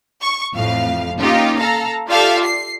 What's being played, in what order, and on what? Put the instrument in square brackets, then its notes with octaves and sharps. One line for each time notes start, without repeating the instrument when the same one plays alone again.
[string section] C#6
A1 F2 A2 F5
A#3 C#4 D#4 F4 G4
A4 F5 A#5
F4 G4 A4 D5 E5 F5
C7